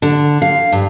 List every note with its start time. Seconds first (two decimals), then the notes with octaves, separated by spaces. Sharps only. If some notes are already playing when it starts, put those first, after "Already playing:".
0.02 D3
0.42 F5
0.72 G2